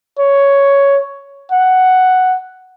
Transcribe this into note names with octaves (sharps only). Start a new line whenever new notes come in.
C#5
F#5